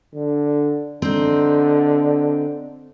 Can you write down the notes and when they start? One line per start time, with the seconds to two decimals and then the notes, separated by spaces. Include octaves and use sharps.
0.15 D3
1.02 D3 C4 D#4